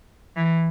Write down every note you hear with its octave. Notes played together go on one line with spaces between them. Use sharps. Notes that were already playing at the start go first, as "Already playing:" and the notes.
E3